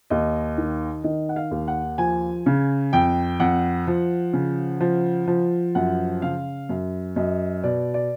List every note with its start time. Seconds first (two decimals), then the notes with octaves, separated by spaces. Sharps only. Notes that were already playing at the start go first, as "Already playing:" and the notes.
0.10 D#2 D#5
0.58 D#3
1.04 D#3 D#5
1.29 F#5
1.36 F5
1.51 D#2
1.68 F#5
1.98 F3 G#5
2.46 C#3
2.93 F2 G5
3.40 F2 F#5
3.87 F3
4.33 C#3
4.80 F3
5.28 F3
5.75 F#2 F#5
6.22 C#3 F5
6.69 F#2
7.16 F#2 D#5
7.63 B2 D5
7.94 D5